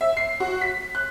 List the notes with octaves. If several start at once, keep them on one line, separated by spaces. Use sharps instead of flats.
E5
C7
F#4
B6
F#6